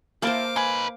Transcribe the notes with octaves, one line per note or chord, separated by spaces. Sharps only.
C3 A#3 E4 A4 A#4 C5 F5 D6
D#4 B4 G#5